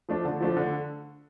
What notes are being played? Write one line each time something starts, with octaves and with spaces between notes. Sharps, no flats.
F3 A3 D4
D3
F3 A3 D4
D3